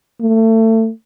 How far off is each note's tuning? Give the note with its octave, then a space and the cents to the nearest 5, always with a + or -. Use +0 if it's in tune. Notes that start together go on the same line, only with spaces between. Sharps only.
A3 +30